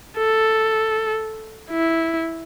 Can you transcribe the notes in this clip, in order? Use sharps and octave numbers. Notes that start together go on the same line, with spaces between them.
A4
E4